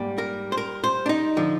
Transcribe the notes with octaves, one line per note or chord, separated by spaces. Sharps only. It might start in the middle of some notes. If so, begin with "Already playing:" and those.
Already playing: G#2 G3 A#3
A#4
C5
A#4
C5
D4
D#4
D3 F3